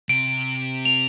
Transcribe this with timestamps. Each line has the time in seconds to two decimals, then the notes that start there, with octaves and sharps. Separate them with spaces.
0.09 C3 D7
0.85 F7